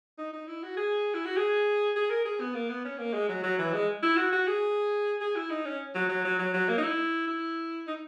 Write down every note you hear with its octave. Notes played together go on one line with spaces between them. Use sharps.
D#4
D#4
E4
F#4
G#4
E4
F#4
G#4
G#4
A#4
G#4
B3
A#3
B3
C#4
A#3
G#3
F#3
F#3
E3
G#3
E4
F#4
F#4
G#4
G#4
E4
D#4
C#4
F#3
F#3
F#3
F#3
F#3
A#3
D#4
E4
E4
D#4